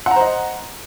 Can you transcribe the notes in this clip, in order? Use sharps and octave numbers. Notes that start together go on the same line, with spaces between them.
C5 D#5 F#5 A#5